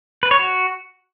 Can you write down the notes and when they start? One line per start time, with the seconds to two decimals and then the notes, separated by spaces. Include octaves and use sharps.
0.23 B4
0.31 C#5
0.39 F#4